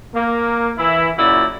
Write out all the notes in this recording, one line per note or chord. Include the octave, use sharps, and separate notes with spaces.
A#3
E3 E4
F#2 A#2 C#3 E4 F#4 D5